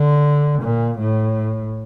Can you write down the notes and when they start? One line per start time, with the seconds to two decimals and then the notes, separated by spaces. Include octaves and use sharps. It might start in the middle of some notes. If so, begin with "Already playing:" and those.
Already playing: D3
0.62 A#2
0.99 A2